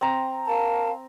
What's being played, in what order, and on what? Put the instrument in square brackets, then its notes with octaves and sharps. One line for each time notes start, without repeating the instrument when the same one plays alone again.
[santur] C4 A#5
[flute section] A#4 F5 A5